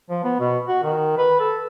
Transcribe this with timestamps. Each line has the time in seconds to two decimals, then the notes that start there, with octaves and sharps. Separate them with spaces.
0.10 F3
0.24 B3
0.39 B2
0.68 F#4
0.83 D#3
1.18 B4
1.40 A4